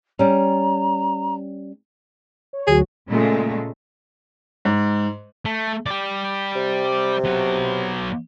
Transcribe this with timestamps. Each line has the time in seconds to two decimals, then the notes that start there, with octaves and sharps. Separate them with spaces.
0.19 G3 C#4 A#5
2.53 C#5
2.67 D2 F#3 F#4 G#4
3.08 A#2 C#3 G#3 A3
4.65 G#2
5.45 A3
5.86 G4 D5
6.55 C3
7.25 F#3 B3